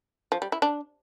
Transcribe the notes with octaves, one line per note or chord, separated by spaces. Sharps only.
F3
G3
E4
D4